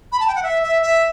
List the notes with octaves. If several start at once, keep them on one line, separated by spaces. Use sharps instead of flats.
B5
A5
G5
F#5
E5
E5
E5